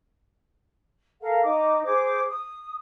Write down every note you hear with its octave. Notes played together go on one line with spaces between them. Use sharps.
A4 A#4 F5 F#5
D#4 D6
G#4 C5 D6
D#6